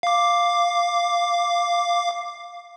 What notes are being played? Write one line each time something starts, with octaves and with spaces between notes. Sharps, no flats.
F5 D6